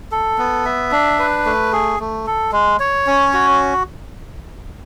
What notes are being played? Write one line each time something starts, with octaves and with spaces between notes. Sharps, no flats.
A4
B3
E5
D4
B4
A3
G#4
A3
A4
G#3
C#5
C#4
F#4